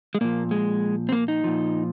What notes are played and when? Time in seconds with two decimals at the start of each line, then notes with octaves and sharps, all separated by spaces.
0.15 G#3
0.21 A#2 F3 A#3
0.51 G#3
1.09 C4
1.12 A#3
1.28 D#4
1.44 A#2 F3